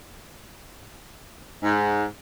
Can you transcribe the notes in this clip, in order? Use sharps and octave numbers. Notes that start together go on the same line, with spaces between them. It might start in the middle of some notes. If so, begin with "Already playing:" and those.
G#2